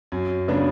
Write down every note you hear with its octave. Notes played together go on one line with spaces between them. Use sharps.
F#2
C#3 F#3 B3 D4